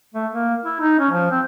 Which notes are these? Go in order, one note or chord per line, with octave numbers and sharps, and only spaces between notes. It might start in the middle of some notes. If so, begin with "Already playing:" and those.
A3
A#3
E4
D#4
C#4
F3
C4